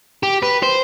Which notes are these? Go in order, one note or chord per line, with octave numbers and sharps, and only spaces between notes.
G4
B4
C5